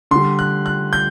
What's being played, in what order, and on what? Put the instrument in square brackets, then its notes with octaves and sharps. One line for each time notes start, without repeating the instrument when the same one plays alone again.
[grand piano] D3 G3 C6
F#6
F#6
G6